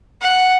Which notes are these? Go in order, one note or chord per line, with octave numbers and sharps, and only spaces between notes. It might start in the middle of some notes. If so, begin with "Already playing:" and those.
F#5